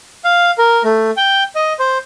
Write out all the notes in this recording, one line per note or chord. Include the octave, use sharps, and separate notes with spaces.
F5
A#4
A3
G5
D#5
C5